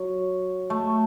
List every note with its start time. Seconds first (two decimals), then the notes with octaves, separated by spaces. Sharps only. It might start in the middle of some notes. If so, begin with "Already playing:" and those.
Already playing: F#3
0.70 A3